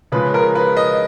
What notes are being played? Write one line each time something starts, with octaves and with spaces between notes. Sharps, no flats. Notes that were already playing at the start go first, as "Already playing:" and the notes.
C#3 F3 G#3 B4
A#4
B4
D#5